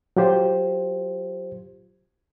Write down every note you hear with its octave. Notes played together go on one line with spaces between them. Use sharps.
F#3 F4 G4 C5